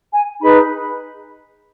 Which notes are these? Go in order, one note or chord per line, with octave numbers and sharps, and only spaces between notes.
G#5
D#4 G#4 B4 B5